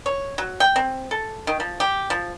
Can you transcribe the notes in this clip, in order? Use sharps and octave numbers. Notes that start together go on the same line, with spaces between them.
C#5
F#3
G5
C4
A4
D#3
F3
G4
F3